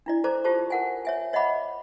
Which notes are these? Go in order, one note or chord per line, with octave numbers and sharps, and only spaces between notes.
D4 E4 D5
A4 C5 D5 A#5 D6
F4 G4 A4 C5 A5 C#6
A#4 F#5 G#5
C#5 E5 G#5
C#5 D#5 E5 F#5 B5 D6